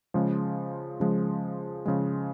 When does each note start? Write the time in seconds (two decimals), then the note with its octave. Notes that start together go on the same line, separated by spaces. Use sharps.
0.14 C#3 F3 G#3
1.00 C#3 F3 G#3
1.86 C#3 F3 G#3